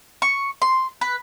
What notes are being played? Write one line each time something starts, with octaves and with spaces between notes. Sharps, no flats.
C#6
C6
B4